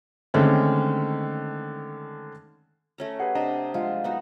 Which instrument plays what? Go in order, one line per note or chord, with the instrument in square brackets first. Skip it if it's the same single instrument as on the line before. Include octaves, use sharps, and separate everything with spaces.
[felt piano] D3 D#3 G#3 A3 C4 C#4
[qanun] A3 C#4 A#5
[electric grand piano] G4 G#4 B4 [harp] F#5 C7
[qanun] C3 [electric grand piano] D4 D#5 A#5 [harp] A#6
[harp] G#3 F5 F#5 [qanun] F4
[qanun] B3 D#4 F#4